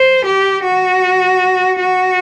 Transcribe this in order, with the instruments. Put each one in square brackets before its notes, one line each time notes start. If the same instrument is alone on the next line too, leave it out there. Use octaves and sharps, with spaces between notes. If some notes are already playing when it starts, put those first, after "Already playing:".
Already playing: [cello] C5
G4
F#4
F#4